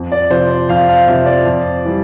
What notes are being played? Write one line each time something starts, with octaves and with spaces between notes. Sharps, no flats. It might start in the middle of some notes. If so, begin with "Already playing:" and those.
Already playing: F2
D5
C3 F3 C5
D5
F2 F5
F5
C3 F3 E5
D5
F2
E3 G3